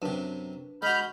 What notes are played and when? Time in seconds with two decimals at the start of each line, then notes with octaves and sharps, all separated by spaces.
0.02 F#2 C3 D4 B4 E7
0.82 G#3 F#4 B5 F6 G6